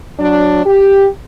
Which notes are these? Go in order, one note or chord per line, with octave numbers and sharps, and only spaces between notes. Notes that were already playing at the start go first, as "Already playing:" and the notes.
F#3 D4
G4